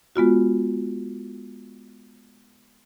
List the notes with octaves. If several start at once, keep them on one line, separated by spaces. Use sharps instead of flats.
G#3 B3 F4 F#4